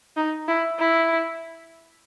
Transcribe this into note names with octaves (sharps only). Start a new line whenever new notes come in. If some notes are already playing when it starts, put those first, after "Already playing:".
D#4
E4
E4